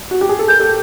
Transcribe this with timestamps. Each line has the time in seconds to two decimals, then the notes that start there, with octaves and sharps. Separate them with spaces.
0.11 F#4
0.21 G4
0.29 G#4
0.39 A4
0.48 G#4 A#4 G6
0.60 G4 A4